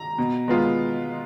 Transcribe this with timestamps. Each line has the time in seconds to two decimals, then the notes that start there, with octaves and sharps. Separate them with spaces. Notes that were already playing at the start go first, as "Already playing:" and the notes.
Already playing: A#5
0.18 B2
0.48 G#3 B3 F4